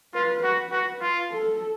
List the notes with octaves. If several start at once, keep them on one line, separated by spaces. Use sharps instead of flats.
F4 B4
F#4 B4
F#4
F4
A4